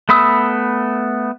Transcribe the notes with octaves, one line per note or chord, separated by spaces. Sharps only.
A3 B3 B5 D#6 E6